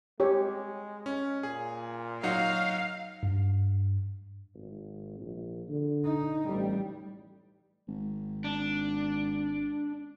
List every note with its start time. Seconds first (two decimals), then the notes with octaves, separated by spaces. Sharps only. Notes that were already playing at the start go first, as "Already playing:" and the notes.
0.20 G#3 G4 C#5
1.06 C#4
1.43 A#2 G#4
2.23 F#3 D#4 F#4 F5
3.23 G2
4.54 G#1
5.20 A#1
5.69 D3
6.05 D#4
6.48 A1 G3
7.88 G#1
8.44 D4